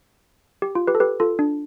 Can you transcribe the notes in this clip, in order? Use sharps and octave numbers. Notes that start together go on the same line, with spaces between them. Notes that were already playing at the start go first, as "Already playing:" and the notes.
G4
F4
G4 B4
A4
G4 B4
F4 A4
D4